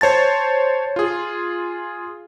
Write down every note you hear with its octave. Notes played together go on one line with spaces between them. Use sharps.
C5 C#5 A5 A6
F4 G#4